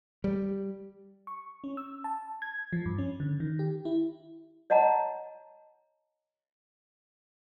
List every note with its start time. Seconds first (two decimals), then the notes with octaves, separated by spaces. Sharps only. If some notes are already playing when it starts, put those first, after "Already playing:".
0.24 G3
1.27 C#6
1.64 C#4
1.77 E6
2.04 A5
2.42 G#6
2.73 F3
2.86 G2
2.98 C#4
3.20 D3
3.40 D#3
3.59 G4
3.85 E4
4.70 C#5 D#5 F#5 A5 A#5